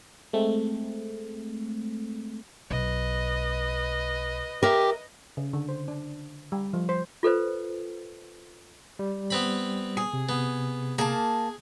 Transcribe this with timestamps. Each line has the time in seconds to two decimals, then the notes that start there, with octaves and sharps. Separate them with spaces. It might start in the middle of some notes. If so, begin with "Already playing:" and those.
0.33 G#3 A3 C4
2.71 B1 B4 D#5
4.63 G4 A#4 E5
5.37 C#3
5.53 D3
5.69 C5
5.88 D4
6.52 G3
6.73 F3
6.89 C5
7.23 F4 A4 B4 C5
8.99 G3
9.30 B3 C4 B5
9.97 G#4
10.13 C3
10.29 B3
10.98 A#3 G#4 A5